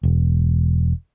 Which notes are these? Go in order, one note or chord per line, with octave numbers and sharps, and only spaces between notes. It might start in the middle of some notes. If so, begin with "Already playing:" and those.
E1